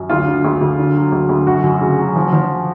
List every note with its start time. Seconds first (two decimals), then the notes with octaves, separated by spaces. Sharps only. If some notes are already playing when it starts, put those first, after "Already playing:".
Already playing: F#2
0.10 D2 F4
0.27 D3
0.45 D2
0.61 D2
0.78 D3
0.96 F#3
1.12 D2
1.29 D2
1.47 F#2 F#4
1.64 F#2
1.81 C#3
1.99 F#3
2.16 F3
2.33 F3